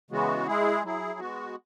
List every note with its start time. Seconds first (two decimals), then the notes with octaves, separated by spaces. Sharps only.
0.11 C#3 E3 G#3 B3 F#4
0.47 G#3 E4 G#4
0.84 F#3 E4 G#4
1.19 G#3 B3 F#4